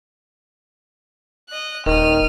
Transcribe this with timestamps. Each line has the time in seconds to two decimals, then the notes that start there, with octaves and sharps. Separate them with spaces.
1.49 D#5 F#6
1.86 D#1 D#3 F6 D#7